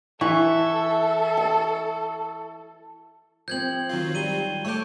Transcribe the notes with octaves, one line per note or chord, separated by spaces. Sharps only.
E3 A4 E5 C#6
A5
F3 C4 G6 G#6 F#7
D#3 F#3 F4
G3 D#7 G7
A3 A4 C#5 C#6 D6 G6